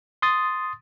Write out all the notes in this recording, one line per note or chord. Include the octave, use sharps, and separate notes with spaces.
C6 D#6 A6